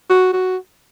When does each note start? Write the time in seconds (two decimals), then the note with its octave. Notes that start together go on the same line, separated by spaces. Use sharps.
0.10 F#4
0.33 F#4